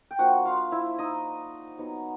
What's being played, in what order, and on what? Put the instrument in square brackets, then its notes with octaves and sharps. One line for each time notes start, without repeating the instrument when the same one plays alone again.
[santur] G5
F3 A#3 D4 F4 F#4 F#5
F4 F5
E4 E5
D#4 D#5
F#3 B3 D#4